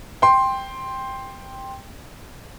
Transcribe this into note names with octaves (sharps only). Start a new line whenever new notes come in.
G5 C6